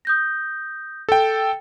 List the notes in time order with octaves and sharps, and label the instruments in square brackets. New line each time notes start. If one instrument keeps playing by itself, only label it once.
[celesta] D#6 G6 A#6
[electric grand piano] A4 G5